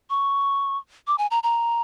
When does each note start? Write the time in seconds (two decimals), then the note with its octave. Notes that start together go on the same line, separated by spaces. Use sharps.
0.10 C#6
1.07 D6
1.18 G#5
1.31 A#5
1.43 A#5